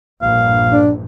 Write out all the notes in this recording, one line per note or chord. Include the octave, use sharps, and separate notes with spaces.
A#1 G2 F5
D4